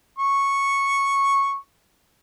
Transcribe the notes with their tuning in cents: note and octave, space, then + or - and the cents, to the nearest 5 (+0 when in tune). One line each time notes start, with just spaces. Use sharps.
C#6 -5